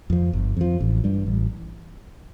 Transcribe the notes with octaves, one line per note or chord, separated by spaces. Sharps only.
F2 F3
G1
F2 F3
A1
G2 G3
A1